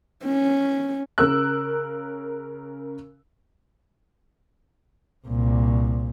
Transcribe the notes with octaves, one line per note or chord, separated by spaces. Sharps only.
C#4
C#3 A#4 E6 F#6
C2 A#2